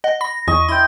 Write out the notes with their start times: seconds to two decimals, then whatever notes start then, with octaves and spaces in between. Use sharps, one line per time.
0.04 D#5 F#5
0.21 B5 A#6
0.48 E2 D#5 C#6
0.68 E4 G5 C6